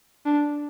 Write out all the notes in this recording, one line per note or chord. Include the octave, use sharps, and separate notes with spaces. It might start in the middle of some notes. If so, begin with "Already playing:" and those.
D4